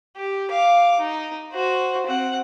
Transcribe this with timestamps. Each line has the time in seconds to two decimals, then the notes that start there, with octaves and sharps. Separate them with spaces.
0.16 G4
0.51 F5 D6
1.00 D#4
1.53 F#4 C5
2.07 C4 F#5